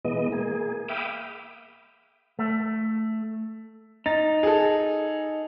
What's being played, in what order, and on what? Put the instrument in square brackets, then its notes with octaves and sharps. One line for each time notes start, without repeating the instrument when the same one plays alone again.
[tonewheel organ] B2 E3 G#3 B3 D#5
A#3 G#4
E5 F5 G5 B5 D6 D#6
[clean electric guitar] A3
[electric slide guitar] D#4 [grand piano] A6
[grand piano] G#4 A4